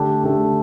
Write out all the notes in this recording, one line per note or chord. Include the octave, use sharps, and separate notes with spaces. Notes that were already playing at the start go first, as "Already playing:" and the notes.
Already playing: D3 A3 D4 G4
D3 A3 D4 G4